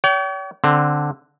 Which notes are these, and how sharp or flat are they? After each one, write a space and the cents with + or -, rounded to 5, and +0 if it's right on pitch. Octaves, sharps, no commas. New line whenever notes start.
C#5 +45 G5 -35
D3 +0 C4 +0